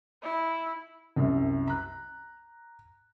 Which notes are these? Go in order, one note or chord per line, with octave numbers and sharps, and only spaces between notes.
E4
C2 F#2
A#5 F#6